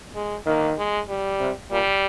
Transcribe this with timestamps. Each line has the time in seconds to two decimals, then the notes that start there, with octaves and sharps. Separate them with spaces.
0.15 G#3
0.46 D#3 A#3
0.78 G#3
1.08 G3
1.40 C3
1.71 A#2 G3